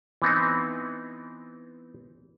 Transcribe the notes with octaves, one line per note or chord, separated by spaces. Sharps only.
E3 B3 C4 D#4